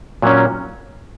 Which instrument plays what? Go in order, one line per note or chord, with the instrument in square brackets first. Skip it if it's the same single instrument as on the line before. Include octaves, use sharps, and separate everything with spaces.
[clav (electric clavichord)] A#2 F#3 A#3 C#4